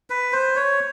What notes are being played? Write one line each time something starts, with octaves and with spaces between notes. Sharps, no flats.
B4
C5
C#5